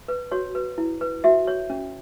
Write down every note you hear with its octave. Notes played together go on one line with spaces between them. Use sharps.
B4
F#4 C#5
B4
E4
B4
F#4 E5
C#5
C#4